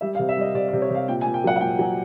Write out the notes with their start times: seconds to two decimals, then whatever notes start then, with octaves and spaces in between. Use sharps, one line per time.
0.01 G3 E5
0.15 F5
0.19 C3
0.29 E5
0.37 G3 D#5
0.54 C3 D5
0.68 D5
0.73 C3
0.82 C#5
0.90 C3 F5
1.08 A#2 G5
1.21 G#5
1.26 A#2
1.34 G5
1.44 F#3 F#5
1.56 F#5
1.61 A#2 G5
1.79 F#3 G#5